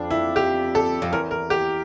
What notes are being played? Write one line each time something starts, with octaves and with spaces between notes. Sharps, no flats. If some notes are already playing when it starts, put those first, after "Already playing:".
Already playing: F2 D4
E4
G4
A4
F2
E2 A#4
A#4
G4